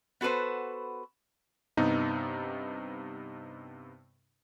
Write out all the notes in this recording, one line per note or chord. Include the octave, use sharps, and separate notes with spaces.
B3 F#4 A4 B4 C5
G2 C3 B3 D#4